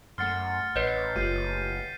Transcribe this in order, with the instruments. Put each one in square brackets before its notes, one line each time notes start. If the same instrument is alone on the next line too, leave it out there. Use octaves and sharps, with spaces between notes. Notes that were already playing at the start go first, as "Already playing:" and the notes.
[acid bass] F#2 [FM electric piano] A3 F#5 C6 [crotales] F6 A6 C#7
[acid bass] A1 [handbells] B4 C#5 D#5 [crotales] G6 B6 C7
[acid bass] F#1 [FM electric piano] A3 F4 G4 [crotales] G6 C7 D#7